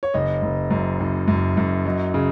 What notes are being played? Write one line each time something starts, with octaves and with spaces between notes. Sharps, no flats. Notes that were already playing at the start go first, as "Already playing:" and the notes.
C#5
F#1 D#5
F#1
F#2
F#1
F#2
F#2
F#3 D#5
C#3